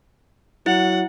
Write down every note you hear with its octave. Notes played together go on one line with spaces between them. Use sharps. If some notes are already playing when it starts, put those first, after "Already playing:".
F#3 E4 F#5